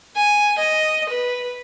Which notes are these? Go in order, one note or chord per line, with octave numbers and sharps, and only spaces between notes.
G#5
D#5
B4